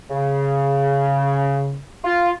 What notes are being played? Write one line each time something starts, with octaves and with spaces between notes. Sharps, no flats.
C#3
F4